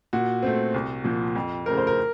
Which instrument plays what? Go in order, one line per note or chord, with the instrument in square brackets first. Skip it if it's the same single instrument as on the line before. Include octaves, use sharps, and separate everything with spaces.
[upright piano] A#2 F#4
A3 C4
C2
A#2 F3
F2
C#3 A3 C4 A#4
C5
A#4